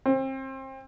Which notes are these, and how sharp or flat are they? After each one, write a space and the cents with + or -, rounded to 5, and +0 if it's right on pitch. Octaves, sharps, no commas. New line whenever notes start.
C4 +30